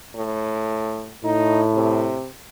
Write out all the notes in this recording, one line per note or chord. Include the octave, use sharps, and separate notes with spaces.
A2
A2 D#4
C3